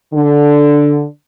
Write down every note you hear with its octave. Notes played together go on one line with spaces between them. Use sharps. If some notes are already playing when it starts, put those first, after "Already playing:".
D3